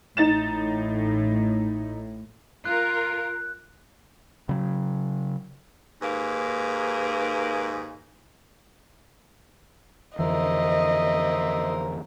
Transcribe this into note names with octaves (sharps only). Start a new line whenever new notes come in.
A1 A2 D#4 A6 E7
F4 A#4 F#6
C#3 F#3
D#2 G#2 A#3 G#4 B4
F2 D3 E3 A#4 C5 D#5 E5